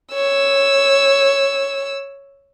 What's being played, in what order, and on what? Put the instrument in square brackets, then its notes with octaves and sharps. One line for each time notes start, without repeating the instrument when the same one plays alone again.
[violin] C#5 E6